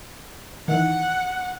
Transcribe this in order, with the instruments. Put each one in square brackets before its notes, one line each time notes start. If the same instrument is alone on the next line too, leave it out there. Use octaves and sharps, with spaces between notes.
[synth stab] D#3 E3 [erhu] F#5